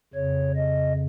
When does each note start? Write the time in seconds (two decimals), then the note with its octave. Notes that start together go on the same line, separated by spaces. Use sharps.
0.14 F2 C#3 C#5
0.56 D#5